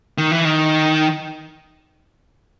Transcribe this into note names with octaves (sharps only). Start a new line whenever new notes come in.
D#3
E3
D#3